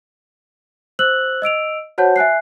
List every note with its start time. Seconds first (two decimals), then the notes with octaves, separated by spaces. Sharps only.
0.99 C5 E6 F#6 F#7
1.42 D#5 E6 D7 F7
1.98 F#4 C5 C#5 F#5 A5 G6
2.16 E5 G#5 F#6 C7